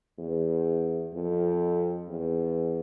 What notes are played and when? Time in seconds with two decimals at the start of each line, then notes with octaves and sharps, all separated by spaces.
0.18 E2
1.13 F2
2.09 E2